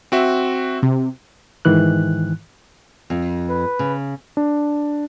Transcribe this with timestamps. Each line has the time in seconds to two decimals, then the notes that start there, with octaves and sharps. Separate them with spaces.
0.12 C4 F#4 E5
0.83 C3
1.65 G#2 D#3 E3 F#6
3.10 F2
3.50 B4
3.79 C#3
4.37 D4